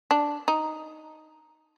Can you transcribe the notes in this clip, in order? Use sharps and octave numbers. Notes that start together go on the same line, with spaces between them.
D4
D#4